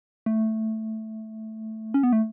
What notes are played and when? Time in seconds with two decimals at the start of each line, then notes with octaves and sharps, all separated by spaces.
0.26 A3
1.94 C#4
2.03 B3
2.13 A3